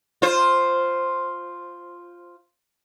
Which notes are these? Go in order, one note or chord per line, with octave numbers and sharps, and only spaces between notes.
F4 C5